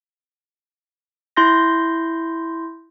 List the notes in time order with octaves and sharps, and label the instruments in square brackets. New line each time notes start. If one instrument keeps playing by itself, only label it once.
[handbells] E4 C6 G6 A#6